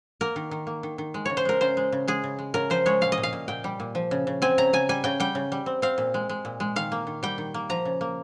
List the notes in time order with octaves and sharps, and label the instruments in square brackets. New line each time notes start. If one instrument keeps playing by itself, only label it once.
[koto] A#3 A#4
D#3
D#3
A#3
D#3
D#3
G#3
C#3 C#5
C5
G#3 A#4
C#3 C5
G#3
C#3
G#3 G#4
C#3
G#3
C#3 A#4
F3 C5
G#3 C#5
A#2 F5
D#5
A#2
F5
A#2
A#2 G5
G3
A#2
F3
C#3
C#3
C4 G#5
C#3 A#5
C#3 G#5
G3 G#5
C#3 G5
G3 G5
C#3
G3
C4
C4 F5
A#2
G#3
G#3
A#2
G#3
D#3 F5
A#3
D#3
G3 G5
D#3
A#3
F3 A#5
C#3
A#3